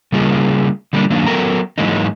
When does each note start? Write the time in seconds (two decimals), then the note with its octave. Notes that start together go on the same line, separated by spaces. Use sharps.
0.12 C#3 G3 A#3 F4 G#4
0.93 D3 G3 A#3 D4
1.10 D#3 F#3 A#3 D4
1.26 F#3 B3 A4 A#4 G5 A#5
1.78 G#2 E3 F#3 G#3 A#3 D#4